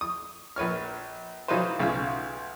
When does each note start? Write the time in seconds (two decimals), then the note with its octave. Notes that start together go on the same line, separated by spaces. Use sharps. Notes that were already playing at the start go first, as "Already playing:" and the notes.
0.01 D#6
0.56 A#1 B4 C#5 F6
1.48 E3 F#3 D#4 F4 B4 C5
1.80 B1 C#3 F4 E5